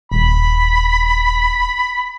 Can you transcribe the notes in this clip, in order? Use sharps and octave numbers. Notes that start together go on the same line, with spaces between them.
D#1 B5